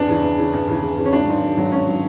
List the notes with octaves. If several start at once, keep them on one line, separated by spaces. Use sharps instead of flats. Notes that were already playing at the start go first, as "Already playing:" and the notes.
Already playing: E2 D4
C#3 E3
E2
C#3 E3
E2
C#3 E3
E2
C#3 E3
C#4
G#1 D4
G#2 D#3 F#3
G#1
G#2 D#3 F#3
G#1 C#4
D#3 F#3